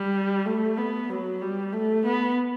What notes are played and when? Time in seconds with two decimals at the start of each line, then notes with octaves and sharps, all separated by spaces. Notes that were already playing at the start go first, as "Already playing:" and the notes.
Already playing: G3
0.45 A3
0.77 B3
1.09 F#3
1.41 G3
1.73 A3
2.05 B3